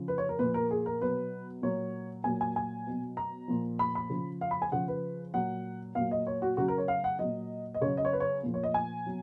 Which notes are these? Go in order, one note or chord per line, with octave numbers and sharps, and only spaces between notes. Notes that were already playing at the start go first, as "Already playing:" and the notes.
Already playing: C#3 F3
B4
C#5
A#4
A#2 F3 B4
A#4
G#4
A#4
B2 F#3 B4
A#2 F#3 C#5
A#2 F#3 G#5
G#5
G#5
B2 F#3
A#5
A#2 F3
B5
B5
C#3 F3
F5
B5
G#5
C#3 F3 F#5
B4
A#2 F#3 F#5
A#2 F#3 F5
D#5
C#5
F#4
C#3 F#3 F#4
A#4
C#5
F5
F#5
F#3 D#5
A#2
D#5
C#3 F#3 C#5
D#5
C#5
B4
C#5
A#2 F3
C#5
D#5
G#5
B2 F#3